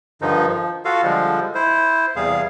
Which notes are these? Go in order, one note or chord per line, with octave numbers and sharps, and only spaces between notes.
G2 D3 D#3 F3 D#4
F3
F4 F#4 A4 F5
D3 F3 G3 G#3
E4 C5
E2 C3 G3 G#4 F5